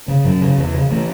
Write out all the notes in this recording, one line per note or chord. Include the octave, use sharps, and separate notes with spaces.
C#3
F#2 F#3
C#3
E2
C#3
E3 A3